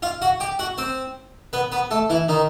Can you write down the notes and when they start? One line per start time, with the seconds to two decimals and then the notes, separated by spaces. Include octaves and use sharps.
0.02 F4 F5
0.22 F#4 F#5
0.40 G4 G5
0.59 F#4 F#5
0.78 C4 C5
1.53 B3 B4
1.72 B3 B4
1.91 A3 A4
2.10 E3 E4
2.29 D#3 D#4